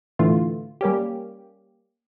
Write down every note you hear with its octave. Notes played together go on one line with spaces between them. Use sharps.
A2 D3 E3 A3 F4
G3 A#3 C#4 G4